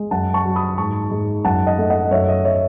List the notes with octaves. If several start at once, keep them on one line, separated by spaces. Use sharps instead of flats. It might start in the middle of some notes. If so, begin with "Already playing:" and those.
Already playing: G#3
F#2 F#5 A5
A5 C#6
F#3
B5 D#6
G#2 A5 C#6
G#2
F#2 F#5 A5
D#5 F#5
A3
D#5 F#5
F#2 C#5 E5
D#5
C#5 E5